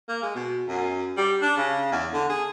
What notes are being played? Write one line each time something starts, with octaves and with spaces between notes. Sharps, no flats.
A#3
G#3
B2
F#2
G3
D4
C#3
E2
D3
G#4